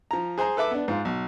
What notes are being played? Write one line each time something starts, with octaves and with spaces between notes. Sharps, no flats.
F3 A#5
G#4 C5 G#5 A#5
A4 B4 E5 D6
B3 D4
G#2 F4
B1